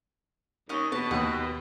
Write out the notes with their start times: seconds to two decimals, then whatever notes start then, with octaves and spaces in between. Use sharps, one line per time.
0.69 D#2 C#4 D#5
0.92 B2 B3 A5
1.11 D#2 F#5 D#6